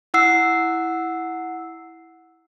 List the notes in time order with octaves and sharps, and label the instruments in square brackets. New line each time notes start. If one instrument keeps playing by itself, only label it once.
[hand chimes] E4 F#5 E6 C7